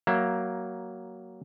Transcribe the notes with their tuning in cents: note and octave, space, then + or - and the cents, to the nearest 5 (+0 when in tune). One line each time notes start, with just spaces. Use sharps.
F#3 +15 A#3 +10 E5 +20